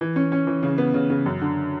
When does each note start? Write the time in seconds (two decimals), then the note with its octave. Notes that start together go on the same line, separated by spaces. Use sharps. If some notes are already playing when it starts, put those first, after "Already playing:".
0.01 E3
0.16 C#4
0.32 C#4
0.47 E3
0.63 C#3
0.78 B3
0.94 C#3
1.10 C#3
1.26 F#2
1.41 D3